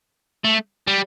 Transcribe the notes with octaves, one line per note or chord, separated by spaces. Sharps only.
A3
G3